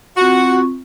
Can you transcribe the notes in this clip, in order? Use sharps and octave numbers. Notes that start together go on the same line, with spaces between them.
C4 F4 F#4 C#6